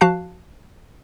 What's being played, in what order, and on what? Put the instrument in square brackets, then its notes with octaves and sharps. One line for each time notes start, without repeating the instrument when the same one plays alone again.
[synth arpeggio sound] F3 F#4 F5 A5 F#6 C7